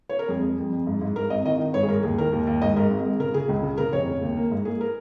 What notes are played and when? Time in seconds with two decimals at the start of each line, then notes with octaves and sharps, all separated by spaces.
0.09 C#5
0.19 A#4
0.28 F2 G#4
0.43 G#3
0.58 F2
0.72 F2
0.87 G#2
1.01 G#2
1.15 G#3 A#4
1.30 G#1 D#5
1.45 D#3 D#5
1.60 D#3
1.74 G#2 C#5
1.83 G#4
1.89 G#2 A#4
2.03 D#2 G#4
2.18 D#3 A#4
2.33 D#2
2.47 D#2
2.62 G#2 D#5
2.76 G#2 A#4
2.90 G#1
3.05 G#3
3.20 C#3 A#4
3.34 C#3 G#4
3.48 C#2
3.63 C#3
3.77 C#3 A#4
3.92 F1 C#5
4.07 C#3
4.22 D#2
4.37 A#3
4.51 G#2
4.65 A#3 G#4
4.81 A#4